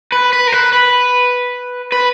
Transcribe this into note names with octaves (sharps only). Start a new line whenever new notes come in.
B4
B4
A#4
B4
B4
B4